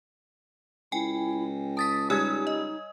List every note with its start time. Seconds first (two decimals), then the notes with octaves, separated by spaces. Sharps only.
0.92 C#2 E4 G5 G#5
1.77 A5 D#6 A6 B6
2.10 G3 D#4 C#5 G#5 D#6 E6 G#6
2.47 D#5